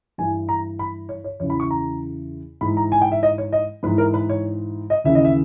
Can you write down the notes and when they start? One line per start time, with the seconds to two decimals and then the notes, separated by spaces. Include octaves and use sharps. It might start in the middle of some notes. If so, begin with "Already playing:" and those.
0.18 G2 E3 G#5
0.49 A#5
0.79 B5
1.09 C#5
1.24 C#5
1.40 E2 C#3 E3 C#5
1.50 B5
1.60 C#6
1.71 A#5
2.61 G#2 E3 B5
2.77 A#5
2.92 G#5
3.02 G5
3.12 E5
3.23 D#5
3.38 C#5
3.53 D#5
3.83 G#2 B4
3.87 E3
3.98 A#4
4.14 B4
4.29 C#5
4.90 D#5
5.04 D#2 C#3 E3 E5
5.15 D#5
5.25 E5